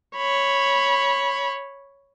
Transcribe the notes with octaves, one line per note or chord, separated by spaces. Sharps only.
C#5 B5